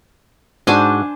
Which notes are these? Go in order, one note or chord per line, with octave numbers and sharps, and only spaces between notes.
G#2 D4 F#4 C5 G#5